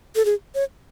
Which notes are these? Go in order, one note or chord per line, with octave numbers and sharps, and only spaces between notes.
A4
G#4
C#5